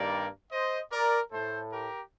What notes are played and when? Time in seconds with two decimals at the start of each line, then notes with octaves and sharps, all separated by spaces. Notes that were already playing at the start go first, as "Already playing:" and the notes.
Already playing: G2 D#3 G3 A#3 A#4 D5
0.52 C5 D#5
0.92 A#4 D5
1.32 A2 A3 A4 C5
1.72 G4 A#4